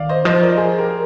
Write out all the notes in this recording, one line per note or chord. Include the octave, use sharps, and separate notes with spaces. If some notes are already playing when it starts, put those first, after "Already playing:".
Already playing: D#3 D5 F5
C5 D#5
F3 C5 D#5
A#4 D5
G#4 C5
G4 A#4